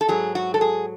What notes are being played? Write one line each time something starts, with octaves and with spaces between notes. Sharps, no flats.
A4
G#2 F#3 G#4
F#4
A4
G#4